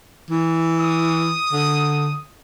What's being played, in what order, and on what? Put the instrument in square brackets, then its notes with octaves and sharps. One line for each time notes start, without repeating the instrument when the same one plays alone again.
[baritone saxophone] E3
[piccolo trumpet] D#6
[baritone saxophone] D3